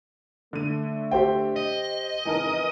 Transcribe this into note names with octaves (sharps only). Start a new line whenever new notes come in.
D3 A3 D#7
G4 C5 G5
D#5
F2 C#3 E3 D#4 A#4